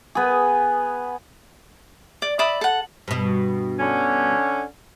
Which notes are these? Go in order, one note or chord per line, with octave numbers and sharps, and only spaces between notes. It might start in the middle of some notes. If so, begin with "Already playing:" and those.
B3 G#4
D5
D5 E5 B5 D#6
A4 F#5
G2 B2
D3 C#4